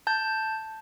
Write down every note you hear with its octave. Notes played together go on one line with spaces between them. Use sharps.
A5 G6